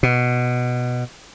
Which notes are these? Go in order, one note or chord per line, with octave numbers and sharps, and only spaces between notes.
B2